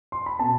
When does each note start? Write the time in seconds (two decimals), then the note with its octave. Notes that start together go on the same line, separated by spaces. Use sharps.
0.12 C6
0.26 B5
0.39 B2 B3 A5